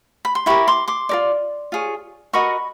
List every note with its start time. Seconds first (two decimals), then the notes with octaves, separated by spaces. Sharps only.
0.25 B5
0.35 C6
0.46 E4 G4 A#4 B5 C#6
0.68 C6 D6
0.88 C6 D6
1.09 F4 A#4 D5
1.72 F4 G#4 C#5
2.33 F#4 A#4 D#5 B5 C#6